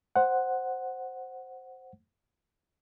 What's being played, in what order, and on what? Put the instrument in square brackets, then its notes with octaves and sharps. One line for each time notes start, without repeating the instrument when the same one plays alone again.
[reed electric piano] C5 F#5